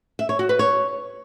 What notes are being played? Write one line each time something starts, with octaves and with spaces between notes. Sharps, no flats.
E5
C#5
F#4
B4
C#5